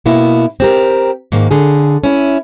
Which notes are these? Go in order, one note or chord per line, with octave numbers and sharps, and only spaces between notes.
B2 A#3 B3 E4
C4 G4 A#4
G#2 D#3 A#3
D3 G#4
C#4 E4